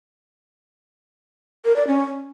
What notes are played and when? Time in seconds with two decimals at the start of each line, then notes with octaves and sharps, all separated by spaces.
1.65 A#4
1.76 D5
1.87 C#4